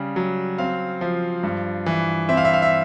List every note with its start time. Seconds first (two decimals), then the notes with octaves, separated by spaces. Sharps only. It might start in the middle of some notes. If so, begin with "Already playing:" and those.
Already playing: C#3 G3
0.16 F#3
0.58 C4 F5
1.01 F3
1.43 G2
1.86 E3
2.29 C4 E5
2.37 F5
2.45 E5
2.53 F5
2.62 E5